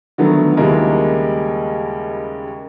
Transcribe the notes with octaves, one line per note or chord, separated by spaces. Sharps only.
D3 D#3 F3 F#3 A3 B3
D#2 C#3 G3 G#3 E4 A#4